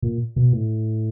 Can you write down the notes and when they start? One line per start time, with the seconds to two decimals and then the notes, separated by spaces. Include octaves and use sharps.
0.02 A#2
0.36 B2
0.53 A2